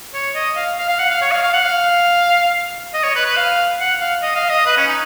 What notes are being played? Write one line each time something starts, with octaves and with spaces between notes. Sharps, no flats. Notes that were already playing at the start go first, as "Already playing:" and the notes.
C#5
D#5
F5
F5
F5
F#5
F5
C#5
F5
F5
F#5
F5
D#5
C#5
B4
B4
F5
F#5
F5
D#5
F5
D#5
B4
C#4
D#4